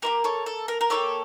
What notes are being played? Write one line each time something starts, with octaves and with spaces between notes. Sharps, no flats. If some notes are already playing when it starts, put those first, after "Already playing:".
A#3 E4 G4 A#4
A4 C#5
A4
A#4
A#4
A#3 E4 G4 A4 C#5